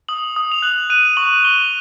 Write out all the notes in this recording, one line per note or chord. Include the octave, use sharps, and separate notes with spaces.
D#6 F#7
D#6
F7
F#6 F#7
F#6 D#7
C#6 F#7
C#6 G7